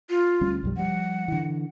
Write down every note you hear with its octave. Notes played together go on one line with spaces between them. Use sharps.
F4
D2 G3 C#4
B1 F#2 G3
F3 G3 F#5
D3 E3